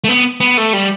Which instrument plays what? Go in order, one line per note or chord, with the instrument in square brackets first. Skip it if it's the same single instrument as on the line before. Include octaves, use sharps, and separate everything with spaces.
[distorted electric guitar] A3
B3
B3
A3
G3